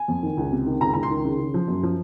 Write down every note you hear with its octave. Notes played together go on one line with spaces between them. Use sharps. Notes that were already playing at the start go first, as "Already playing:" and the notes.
Already playing: G#5
F2
D#3
C#2
C3
D#3
C#2 A#5
C#2 A#5
C6
D#3
C#3
C#3
F3
F#2
F3